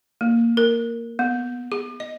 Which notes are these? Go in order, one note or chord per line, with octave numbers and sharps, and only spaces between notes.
A#3
A#4
B3
G#4
D#5